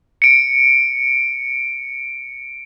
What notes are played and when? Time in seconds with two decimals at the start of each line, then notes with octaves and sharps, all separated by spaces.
0.22 C#7 D7